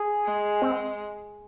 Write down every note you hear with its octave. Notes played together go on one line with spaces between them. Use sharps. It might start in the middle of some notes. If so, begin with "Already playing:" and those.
Already playing: G#4
G#3
C4